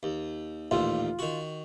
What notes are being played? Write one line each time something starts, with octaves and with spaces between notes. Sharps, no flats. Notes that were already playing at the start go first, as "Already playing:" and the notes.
D#2
A1 D#2 A#2 F4
D#3 F#4